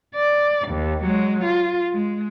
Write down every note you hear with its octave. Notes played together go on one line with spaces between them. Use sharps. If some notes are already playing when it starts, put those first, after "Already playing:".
D5
D#2
F#3 G#3
F4
G#3